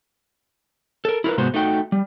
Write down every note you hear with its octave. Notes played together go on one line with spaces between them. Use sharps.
A4 A#4
E4 F4 G#4 A#4 B4
G#2 C3 G#3 B3 F#4 C5
A3 D#4 F#4 G5
G3